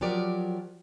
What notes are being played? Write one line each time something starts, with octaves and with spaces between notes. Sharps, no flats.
F3 F#3 G4 A#4 D5